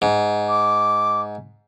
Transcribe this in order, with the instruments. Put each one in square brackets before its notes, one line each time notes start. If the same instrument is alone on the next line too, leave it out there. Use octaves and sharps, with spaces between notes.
[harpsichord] G#2
[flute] D6